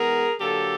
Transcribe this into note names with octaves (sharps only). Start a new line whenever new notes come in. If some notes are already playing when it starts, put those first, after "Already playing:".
Already playing: E3 G#3 B3 G#4 A#4
D3 F#3 A#3 G4 A4